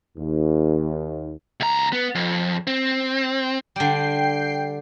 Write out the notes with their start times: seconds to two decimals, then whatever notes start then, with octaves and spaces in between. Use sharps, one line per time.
0.17 D#2
1.60 C#2 A#5
1.93 B3
2.15 F2
2.67 C4
3.76 D3 G3 G5 C7